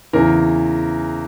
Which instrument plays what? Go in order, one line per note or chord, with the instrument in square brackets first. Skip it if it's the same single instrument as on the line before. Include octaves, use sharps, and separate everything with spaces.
[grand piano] E2 C#3 E3 A#4